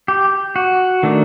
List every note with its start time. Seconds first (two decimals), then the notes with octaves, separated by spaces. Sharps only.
0.08 G4
0.56 F#4
1.03 D#3 A3 D4